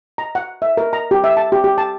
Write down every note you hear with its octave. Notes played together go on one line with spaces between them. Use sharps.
A#5
F#5
E5
A#4
A#5
G4
E5
A5
G4
G4
A5